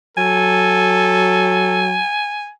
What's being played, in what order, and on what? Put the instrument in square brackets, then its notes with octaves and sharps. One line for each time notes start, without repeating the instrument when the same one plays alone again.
[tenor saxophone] F#3 [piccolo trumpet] A4 [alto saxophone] G#5